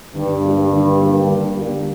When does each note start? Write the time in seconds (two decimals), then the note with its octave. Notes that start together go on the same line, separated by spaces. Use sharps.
0.14 G2 D3
0.42 G3 A#3
0.72 D3
0.99 G3 A#3
1.28 D3
1.57 G3 A#3